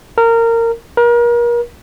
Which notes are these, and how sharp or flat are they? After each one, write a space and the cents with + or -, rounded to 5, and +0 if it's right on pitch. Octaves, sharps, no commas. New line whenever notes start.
A#4 -20
A#4 +35